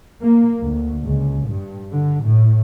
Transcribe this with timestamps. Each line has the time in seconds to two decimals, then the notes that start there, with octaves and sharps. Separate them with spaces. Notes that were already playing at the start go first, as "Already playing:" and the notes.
0.21 A#3
0.62 D2
1.02 C#2
1.47 G2
1.92 D3
2.24 A2